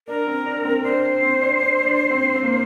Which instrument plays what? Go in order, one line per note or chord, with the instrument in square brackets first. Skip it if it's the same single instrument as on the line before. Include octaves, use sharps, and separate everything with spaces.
[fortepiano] D4 [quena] A#4
[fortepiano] C4
D4
C4
[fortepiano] D4 [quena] C5
[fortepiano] C4
D4
D4
D4
C4
C4
A#3